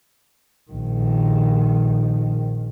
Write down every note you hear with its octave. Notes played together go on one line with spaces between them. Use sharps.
A#1 D#3